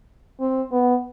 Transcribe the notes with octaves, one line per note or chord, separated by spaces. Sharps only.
C4
B3